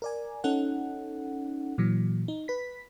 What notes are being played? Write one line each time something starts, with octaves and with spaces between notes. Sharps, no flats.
A#4 D5 G#5
C#4 D#4 A4 F#5
A#2 E3 F#3
D#4
B4 B6